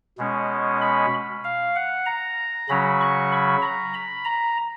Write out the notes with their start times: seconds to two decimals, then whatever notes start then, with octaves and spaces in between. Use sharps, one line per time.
0.18 B2 G#3 C#4
0.81 B5
1.44 F5
1.76 F#5
2.06 A#5
2.69 C#3 F#3 C#4 B5
3.01 C#6
3.32 B5
3.62 A#5
3.94 B5
4.25 A#5